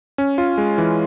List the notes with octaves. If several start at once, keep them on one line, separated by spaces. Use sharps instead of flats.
C#4
F4
G#3
E3